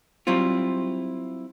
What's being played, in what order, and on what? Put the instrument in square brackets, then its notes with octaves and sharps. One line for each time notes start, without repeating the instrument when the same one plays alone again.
[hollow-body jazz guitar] F#3 G3 C4 E4 F4